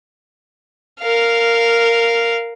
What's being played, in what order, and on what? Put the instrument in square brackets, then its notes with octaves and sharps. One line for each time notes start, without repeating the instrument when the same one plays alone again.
[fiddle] A#4 F5